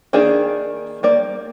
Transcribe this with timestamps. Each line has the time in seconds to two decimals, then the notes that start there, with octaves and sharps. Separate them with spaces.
0.13 D#3 A#3 D4 G#4
1.03 G3 A#3 D5